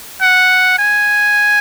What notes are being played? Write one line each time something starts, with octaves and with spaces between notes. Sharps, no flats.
F#5
G#5